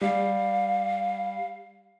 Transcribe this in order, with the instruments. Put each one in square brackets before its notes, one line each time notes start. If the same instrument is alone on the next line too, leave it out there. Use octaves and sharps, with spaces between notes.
[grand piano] G3 [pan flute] F5